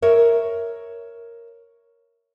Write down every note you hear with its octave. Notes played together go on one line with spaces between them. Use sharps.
A#4 C#5 E5